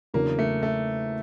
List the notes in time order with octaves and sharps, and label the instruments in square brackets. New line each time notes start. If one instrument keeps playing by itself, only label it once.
[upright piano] E2 C#3 F#3 B3 D4 [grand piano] A#3
[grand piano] A3
A3